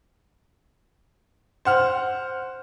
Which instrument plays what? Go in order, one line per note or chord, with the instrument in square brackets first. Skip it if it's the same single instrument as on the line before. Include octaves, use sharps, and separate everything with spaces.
[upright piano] C5 F#5 F6